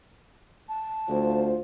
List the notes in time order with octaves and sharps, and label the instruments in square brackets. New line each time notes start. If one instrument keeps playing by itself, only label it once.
[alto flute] A5
[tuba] D2 [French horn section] F4 C5